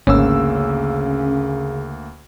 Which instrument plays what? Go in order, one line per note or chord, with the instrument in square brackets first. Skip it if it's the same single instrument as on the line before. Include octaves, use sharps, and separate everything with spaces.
[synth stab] G#1 [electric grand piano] D2 A#3 E6 [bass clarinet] C#3 [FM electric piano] C#4